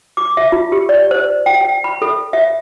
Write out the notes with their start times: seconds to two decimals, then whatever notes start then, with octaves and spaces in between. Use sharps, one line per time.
0.17 D6
0.37 E5
0.52 F4
0.72 G4
0.89 D5
1.11 C5
1.46 G5
1.61 G5
1.84 B5
2.02 A4
2.33 E5